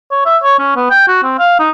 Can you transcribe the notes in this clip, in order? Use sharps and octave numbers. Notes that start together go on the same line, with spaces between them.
C#5
E5
C#5
C#4
B3
G5
F#4
C4
F5
D#4